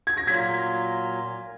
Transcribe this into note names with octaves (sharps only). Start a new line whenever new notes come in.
G#6
A#6
A#2 F#3 A#3 F4 G#6 B6